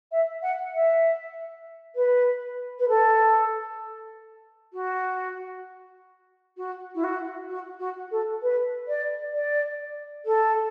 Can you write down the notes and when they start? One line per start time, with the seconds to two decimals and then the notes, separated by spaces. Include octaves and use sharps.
0.11 E5
0.42 F#5
0.73 E5
1.95 B4
2.79 B4
2.88 A4
4.73 F#4
6.57 F#4
6.94 E4
7.04 F#4
7.49 F#4
7.79 F#4
8.11 A4
8.42 B4
8.88 D5
9.33 D5
10.25 A4